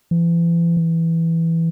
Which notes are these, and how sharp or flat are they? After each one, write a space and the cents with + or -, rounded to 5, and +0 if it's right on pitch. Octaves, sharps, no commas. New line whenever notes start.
E3 +40
E3 +0